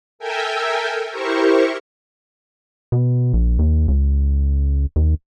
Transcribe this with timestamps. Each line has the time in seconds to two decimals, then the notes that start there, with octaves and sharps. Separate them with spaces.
0.19 A4 A#4 E5 G5 G#5
1.10 E4 G4 A#4 C5 C#6
2.92 B2
3.34 A#1
3.59 D#2
3.88 C#2
4.96 D#2